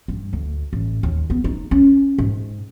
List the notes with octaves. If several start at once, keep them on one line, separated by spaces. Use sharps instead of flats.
G2
D2
A1
D#2
B3
D#4
C#4
G#2